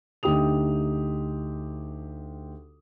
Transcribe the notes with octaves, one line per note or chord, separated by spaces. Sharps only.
D2 D#4 G4 G5 D#6 F7